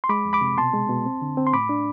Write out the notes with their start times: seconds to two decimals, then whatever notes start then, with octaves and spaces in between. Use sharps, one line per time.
0.04 C6
0.09 G#3 B5 D6
0.25 F2
0.33 B5 D6
0.41 C3
0.58 B2 A5 C6
0.73 G#3
0.89 B2
1.06 C4
1.22 D3
1.37 C4
1.47 C6
1.53 A2 B5 D6
1.69 D4